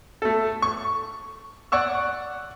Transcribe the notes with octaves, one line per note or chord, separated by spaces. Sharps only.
A3 A4
C#6
D5 F#5 C#6 E6